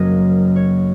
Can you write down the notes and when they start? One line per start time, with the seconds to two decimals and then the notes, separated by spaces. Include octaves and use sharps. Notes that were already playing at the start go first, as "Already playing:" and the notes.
Already playing: F#1 F#2 F#3 A#3 C#4 D#5
0.56 C#5